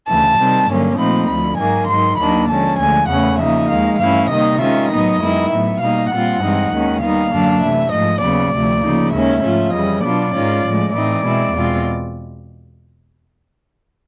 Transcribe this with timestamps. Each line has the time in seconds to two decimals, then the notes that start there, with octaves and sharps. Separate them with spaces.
0.08 D2 C#3 E3 A5
0.38 C3 D#3 G3 C4
0.68 G2 D3 F#3 A#3 C#4
0.98 A#2 F3 A3 C4 D#4 B5
1.28 D2 D3 F3 B5
1.58 G#2 D#3 F#3 A#3 G#5
1.88 G#2 D#3 F#3 C6
2.19 D#2 D#3 F#3 A#3 D4 B5
2.49 D3 F3 G#3 C#4 A5
2.79 D2 D3 F3 G#3 G#5
3.09 E2 C#3 E3 A3 C#4 F#5
3.39 C#3 F3 A#3 D#4 E5
3.69 D#2 D#3 G#3 F5
4.00 G2 E3 A3 C#4 E4 F5
4.30 C3 D#3 G3 A#3 D#4 D#5
4.60 D#3 G#3 C#4 F4 E5
4.90 A2 F#3 B3 D#4 D#5
5.20 F#2 D#3 G#3 B3 E4
5.51 A2 F#3 B3 E5
5.81 B2 G3 A#3 D#4 F5
6.11 A#2 G3 C4 F4 F#5
6.41 G2 E3 G#3 C4 D#4
6.71 D#2 D#3 G#3 C#4
7.02 D#3 G3 B3 D#4 F5
7.31 F#2 D3 F#3 A#3 D4
7.63 C3 E3 A3 E5
7.92 G#2 F3 A3 D#5
8.22 D#2 C#3 F#3 B3 D5
8.53 D2 C3 F3 A3
8.83 C#3 F3 A#3 D#4
9.13 D#2 D#3 G#3 C#4 E5
9.43 G#2 F3 A3 C#4 F4
9.74 F2 C#3 E3 G3 D#5
10.04 B2 F#3 B3 D4 F4 D5
10.33 G#2 D#3 G#3 C#4 F4
10.64 A2 F3 G#3
10.94 A2 E3 A3 C4 D#4 D5
11.25 B2 G#3 C4 E4
11.54 E2 B2 G#3 C4 F4